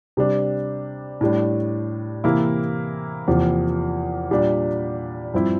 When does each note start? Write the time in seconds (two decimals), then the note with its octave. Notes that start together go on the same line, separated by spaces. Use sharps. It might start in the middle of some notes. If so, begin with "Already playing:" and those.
0.17 C3 G3 D4
1.21 A2 G3 D4
2.24 C3 E3 A#3 E4
3.27 E2 C3 F3 A#3
4.31 A#2 G3 D4
5.34 G2 F3 C4 E4